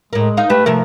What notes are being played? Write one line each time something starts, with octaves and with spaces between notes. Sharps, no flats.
A2 G#3 A#4
D#4 F5
A3 G4 B4
C3 F3 A3 A#4